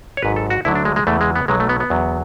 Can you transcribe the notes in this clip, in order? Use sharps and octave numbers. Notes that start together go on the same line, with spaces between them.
C#5
G#1 G#2 F#3 B4
A4
F#4
D2 D3 F#3 E4
D4
G#3
G#3
E2 C#3 E3 A3
G#3
B3
B1 B2 F#3 G#3
A3
B3
B3
E2 D3 F#3